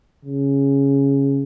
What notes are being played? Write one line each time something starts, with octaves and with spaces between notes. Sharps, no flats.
C#3